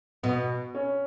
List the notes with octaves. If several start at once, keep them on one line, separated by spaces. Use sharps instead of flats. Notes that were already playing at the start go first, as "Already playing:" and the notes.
B2 B3
C#4